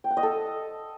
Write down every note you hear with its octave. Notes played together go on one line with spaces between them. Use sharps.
G5
F#5
D#5
A4